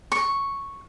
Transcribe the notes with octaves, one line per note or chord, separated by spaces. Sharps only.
C#6